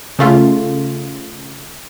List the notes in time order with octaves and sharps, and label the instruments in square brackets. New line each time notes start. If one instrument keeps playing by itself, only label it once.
[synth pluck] C#3 A3 F4